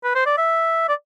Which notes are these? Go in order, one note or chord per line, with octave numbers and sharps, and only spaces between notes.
B4
C5
D5
E5
D5